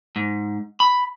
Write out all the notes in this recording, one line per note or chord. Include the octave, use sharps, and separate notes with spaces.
G#2
B5